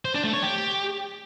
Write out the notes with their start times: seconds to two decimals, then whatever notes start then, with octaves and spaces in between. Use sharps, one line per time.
0.05 C5
0.14 D4
0.24 A3
0.33 C#5
0.43 G4